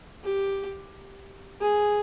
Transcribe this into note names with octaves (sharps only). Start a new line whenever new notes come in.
G4
G#4